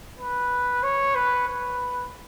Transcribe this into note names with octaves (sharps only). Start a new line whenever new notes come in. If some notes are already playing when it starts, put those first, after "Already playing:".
B4
C#5
B4
B4